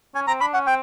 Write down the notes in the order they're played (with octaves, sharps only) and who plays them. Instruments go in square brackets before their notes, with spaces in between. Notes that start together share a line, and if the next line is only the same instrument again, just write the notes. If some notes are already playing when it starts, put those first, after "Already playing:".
[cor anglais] C#4 [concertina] G#5
[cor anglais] C4 [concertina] A#5
[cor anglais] D4 [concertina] B5
[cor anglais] C#4 [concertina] F#5
[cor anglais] C4 [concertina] G5